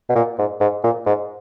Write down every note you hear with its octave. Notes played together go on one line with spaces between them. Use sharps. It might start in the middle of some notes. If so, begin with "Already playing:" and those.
B2
A#2
G#2
G#2
A#2
G#2